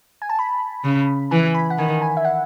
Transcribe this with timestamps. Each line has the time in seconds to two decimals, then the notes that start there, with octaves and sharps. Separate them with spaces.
0.22 G#5
0.29 A5
0.39 B5
0.84 C#3
1.31 E3 G#5
1.54 B5
1.70 F#5
1.78 D#3 G#5
2.02 G#5
2.17 E5
2.25 F#5